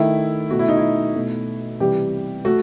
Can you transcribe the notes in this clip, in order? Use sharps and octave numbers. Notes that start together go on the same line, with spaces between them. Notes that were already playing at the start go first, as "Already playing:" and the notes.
Already playing: D#3 A3 E4
B2 A3 F#4
E4
D#4
E4
B2 A3
C3 E3 G3 G4
A3 F#4